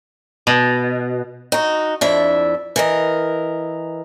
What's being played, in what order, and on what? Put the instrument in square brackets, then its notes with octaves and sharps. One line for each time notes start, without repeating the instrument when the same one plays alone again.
[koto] B2
[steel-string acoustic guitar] D#4 F#4
F2 D4 E4 E5
E3 A#4 D#5